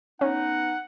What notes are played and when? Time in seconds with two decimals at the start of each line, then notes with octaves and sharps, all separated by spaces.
0.21 B3 C#4 D#4 F#5